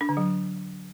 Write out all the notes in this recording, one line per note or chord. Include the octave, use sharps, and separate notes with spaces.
D4
D3
F#3